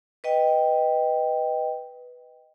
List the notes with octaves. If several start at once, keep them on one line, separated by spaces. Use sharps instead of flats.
B4 D#5 G5